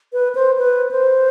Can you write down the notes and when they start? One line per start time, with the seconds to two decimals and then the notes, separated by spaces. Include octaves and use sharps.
0.13 B4
0.35 C5
0.58 B4
0.91 C5